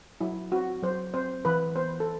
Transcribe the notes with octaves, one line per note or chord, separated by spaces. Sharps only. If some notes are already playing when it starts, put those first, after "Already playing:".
F#3 E4
C4 F#4
F#3 C5
C4 C5
E3 B4
B3 C5
A4